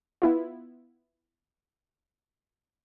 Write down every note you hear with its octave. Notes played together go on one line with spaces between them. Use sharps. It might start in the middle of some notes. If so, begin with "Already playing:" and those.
B3 E4 F4